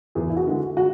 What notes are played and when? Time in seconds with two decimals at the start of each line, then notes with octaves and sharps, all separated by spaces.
0.15 E2 G#4
0.30 E4
0.37 F#4
0.47 D3 G#3
0.77 F#4